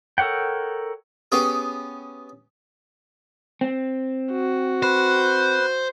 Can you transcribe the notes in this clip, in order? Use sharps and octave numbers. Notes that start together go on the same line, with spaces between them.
A4 A#4 C#5 F#5 G5
B3 C#4 G4 G#4
C4
F#4
B4 C5